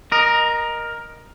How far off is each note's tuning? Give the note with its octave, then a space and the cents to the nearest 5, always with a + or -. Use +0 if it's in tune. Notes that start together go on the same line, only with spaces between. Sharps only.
A#4 +10 D#5 -15